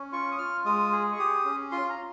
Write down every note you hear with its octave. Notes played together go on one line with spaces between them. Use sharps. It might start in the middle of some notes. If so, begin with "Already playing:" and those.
Already playing: C#4
F4 C#6
D#6
F4 F6
G#3 D#6
G#4
C#6
G4 D#6
C#4
F4 C6
A#5